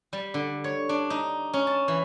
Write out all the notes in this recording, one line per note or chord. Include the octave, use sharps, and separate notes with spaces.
G3
D3
C#5
D4
D#4
C#4
A5
E3